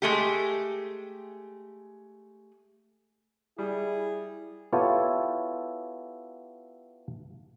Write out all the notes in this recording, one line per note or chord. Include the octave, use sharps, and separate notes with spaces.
G#3 A3 G4
G3 E4 G#4
B3 E4 F4 G4 A4 C#5